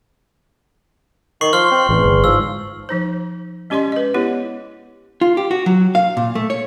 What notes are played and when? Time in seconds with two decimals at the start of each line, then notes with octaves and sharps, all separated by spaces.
1.41 D#3 C#6 C7 F#7
1.53 F3 C6 F6 G7
1.71 C4
1.89 A1 E2
2.04 G1
2.24 G#2 F3 E6
2.89 F3 D#4 C5
3.70 G#3 C#4 G4 D5 D#5 C6
3.92 B4 D#5
4.14 B3 E4 G4 C#5
5.21 F4
5.37 G4
5.51 F#4
5.66 F#3
5.95 F5
6.17 A#2
6.35 A3
6.50 C#5